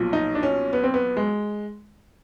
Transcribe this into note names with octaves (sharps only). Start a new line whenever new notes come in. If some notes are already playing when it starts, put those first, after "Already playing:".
Already playing: B1 A#2 F3
D#4
D4
C#4
B3
C4
B3
G#3